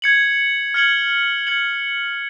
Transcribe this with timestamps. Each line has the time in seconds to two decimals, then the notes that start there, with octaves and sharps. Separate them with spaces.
0.02 G#6 C#7 F#7
0.74 F6 G#6 C#7 F#7
1.47 G#6 C#7 F#7